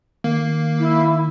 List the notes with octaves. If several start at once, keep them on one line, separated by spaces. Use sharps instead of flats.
D#3 A#3
E4